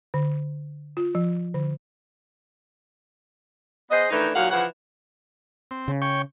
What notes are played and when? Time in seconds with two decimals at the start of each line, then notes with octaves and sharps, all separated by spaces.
0.14 D3
0.97 F4
1.15 F3
1.54 D3
3.91 B3 G#4 C5 D#5
4.11 D#3 E3 A3 D4 D#4
4.35 D#2 A#2 F#3 F#4 F5 F#5
4.51 C#3 E3 F3 F#5
5.71 C4
5.88 C#3
6.02 C#5 G5 C#6